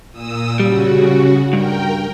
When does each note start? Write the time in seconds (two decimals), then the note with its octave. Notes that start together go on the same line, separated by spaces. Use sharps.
0.12 A#2 D#6 E6
0.60 C#3 G3 F#4
1.53 G2 A#4 G5